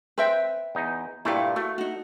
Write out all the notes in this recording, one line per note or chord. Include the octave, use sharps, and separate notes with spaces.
C4 B4 E5 G5
E2 D#4
G2 A#2 A3 E4 G4 F5
A3 F#4
D#4 F#4